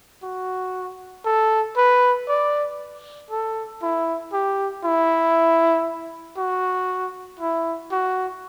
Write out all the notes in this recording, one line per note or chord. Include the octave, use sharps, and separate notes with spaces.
F#4
A4
B4
D5
A4
E4
G4
E4
F#4
E4
F#4